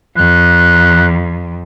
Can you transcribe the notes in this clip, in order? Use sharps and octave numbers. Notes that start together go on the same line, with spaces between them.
F2 F#6